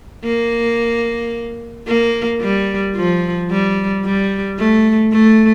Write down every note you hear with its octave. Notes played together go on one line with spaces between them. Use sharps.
A#3
A#3
G3
F3
G3
G3
A3
A3